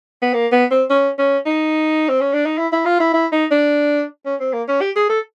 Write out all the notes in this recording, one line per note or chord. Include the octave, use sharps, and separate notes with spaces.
B3
A#3
B3
C4
C#4
C#4
D#4
C4
C#4
D4
D#4
E4
E4
F4
E4
E4
D#4
D4
C#4
C4
A#3
C#4
G4
G#4
A4